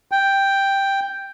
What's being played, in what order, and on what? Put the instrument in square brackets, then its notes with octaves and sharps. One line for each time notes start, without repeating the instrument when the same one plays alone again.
[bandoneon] G5